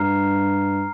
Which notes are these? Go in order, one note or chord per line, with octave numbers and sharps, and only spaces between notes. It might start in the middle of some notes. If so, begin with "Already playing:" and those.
Already playing: G2 A#5 F6 C7